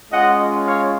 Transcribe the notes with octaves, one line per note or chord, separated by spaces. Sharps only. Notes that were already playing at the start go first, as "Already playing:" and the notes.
G#3 C#4 F4 D#5 F#5
C#5 F5